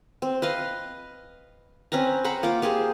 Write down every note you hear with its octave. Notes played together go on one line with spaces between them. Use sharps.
C4
B4 D#5 F5
C4 C#4 B4 A#5
C5 F#5 A#5 B5
A#3 F4 D6
A#3 G4 G#4 C5